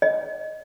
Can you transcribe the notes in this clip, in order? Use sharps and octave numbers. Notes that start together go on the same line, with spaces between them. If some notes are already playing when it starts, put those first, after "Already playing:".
D#5